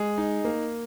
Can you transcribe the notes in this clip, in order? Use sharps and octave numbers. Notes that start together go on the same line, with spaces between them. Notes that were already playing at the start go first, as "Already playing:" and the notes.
Already playing: G#3 G#4
D#4
A#3